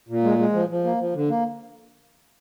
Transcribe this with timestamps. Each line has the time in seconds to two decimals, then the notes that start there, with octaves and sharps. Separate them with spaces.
0.09 A#2
0.24 G#3
0.38 G#3
0.53 F3
0.69 F3
0.84 A#3
0.99 F3
1.14 D3
1.29 A#3